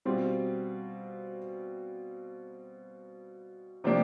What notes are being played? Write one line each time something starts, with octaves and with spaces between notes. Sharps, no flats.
B2 G3 C4 F4
C3 F3 A#3 D4 G4